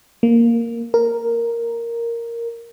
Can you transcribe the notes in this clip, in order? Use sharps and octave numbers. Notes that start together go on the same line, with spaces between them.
A#3
A#4